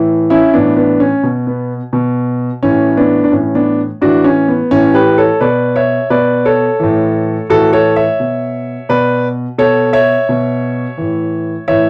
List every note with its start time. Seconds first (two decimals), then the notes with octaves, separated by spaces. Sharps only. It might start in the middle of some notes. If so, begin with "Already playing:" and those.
Already playing: A2 E3
0.30 C#4 E4
0.53 A2 E3 B3 D4
0.77 B3 D4
1.00 C#4
1.23 B2
1.47 B3
1.93 B2
2.63 A2 E3 C#4
2.97 B3 D4
3.24 D4
3.32 A2 E3 C#4
3.55 B3 D4
4.01 A2 E3 D4 F#4
4.24 C#4
4.48 B3
4.71 A2 E3 C#4
4.94 G4 B4
5.18 A4 C#5
5.41 B2 B4 D5
5.76 C#5 E5
6.10 B2 B4 D5
6.45 A4 C#5
6.79 A2 E3
7.49 A2 E3 F#4 A4
7.73 A4 C#5
7.96 C#5 E5
8.20 B2
8.89 B2 B4 D5
9.58 B2 A4 C#5
9.93 C#5 E5
10.29 B2
10.97 A2 E3
11.68 A2 E3 C#5 E5